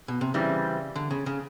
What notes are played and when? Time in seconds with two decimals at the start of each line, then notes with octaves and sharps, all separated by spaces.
0.08 B2
0.21 C3
0.34 C#3 E3 G3 C4
0.96 D3
1.11 C#3
1.26 C#3